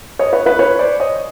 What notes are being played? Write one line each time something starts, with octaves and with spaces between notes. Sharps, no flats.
C#5 D#5
B4 C#5
B4
B4 C#5
C5 D5
C#5 D#5